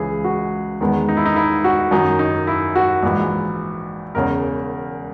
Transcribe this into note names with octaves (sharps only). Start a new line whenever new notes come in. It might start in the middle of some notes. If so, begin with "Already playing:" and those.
Already playing: C#2 C#3 E3 G#4
F#4
E2 D#3 G#3 B3
D#4
E4
D#4
E4
F#4
F#2 D#3 F#3 D#4
D#4
E4
F#4
A#1 G#2 E3
E1 E2 C#3 A#4